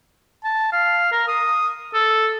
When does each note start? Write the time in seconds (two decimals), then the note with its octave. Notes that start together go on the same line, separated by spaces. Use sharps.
0.44 A5
0.72 F5
1.12 A#4
1.28 D#6
1.94 A4